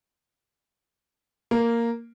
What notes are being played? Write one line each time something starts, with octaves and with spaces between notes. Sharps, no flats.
A#3